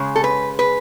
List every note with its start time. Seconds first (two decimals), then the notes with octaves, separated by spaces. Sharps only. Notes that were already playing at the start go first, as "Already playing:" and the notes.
Already playing: C#3 G#3
0.16 A4
0.24 B4
0.59 B4